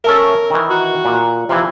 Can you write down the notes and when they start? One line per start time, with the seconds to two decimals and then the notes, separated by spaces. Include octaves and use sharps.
0.04 C#4 A4 A#4 E5
0.50 D#3 E3
0.70 F#4
1.05 A#2
1.49 C3 E3 F3